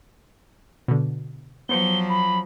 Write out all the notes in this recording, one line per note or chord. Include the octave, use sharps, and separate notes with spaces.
B2 D3
F3 F#3 B3 C5 C#7 G7
B5